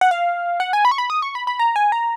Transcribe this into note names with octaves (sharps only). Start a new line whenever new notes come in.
F#5
F5
F#5
G#5
B5
C#6
B5
D#6
C#6
B5
B5
A#5
G#5
A#5